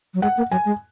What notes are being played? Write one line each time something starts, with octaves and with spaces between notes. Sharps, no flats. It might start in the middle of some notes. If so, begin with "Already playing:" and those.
F#3
G#3 F#5
A#3
F#3 G#5
G#3